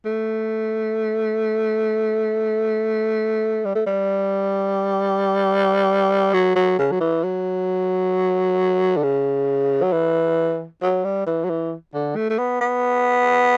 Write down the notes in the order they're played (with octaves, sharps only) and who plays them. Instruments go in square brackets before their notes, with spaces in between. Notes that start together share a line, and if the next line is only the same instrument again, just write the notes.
[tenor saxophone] A3
G3
A3
G3
F#3
F#3
C#3
F#3
E3
F#3
D3
C#3
F#3
E3
F#3
G3
E3
F#3
E3
D3
A3
A3
B3
B3